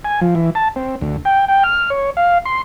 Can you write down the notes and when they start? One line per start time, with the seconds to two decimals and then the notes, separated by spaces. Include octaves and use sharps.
0.05 G#5
0.21 F3
0.35 E3
0.55 A5
0.76 C4
1.01 D2
1.25 G5
1.48 G5
1.64 F6
1.90 C#5
2.17 F5
2.45 C6